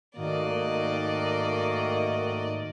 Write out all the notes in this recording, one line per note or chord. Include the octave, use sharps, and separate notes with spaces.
G#2 D#3 A3 A#3 F#4 D5 D#5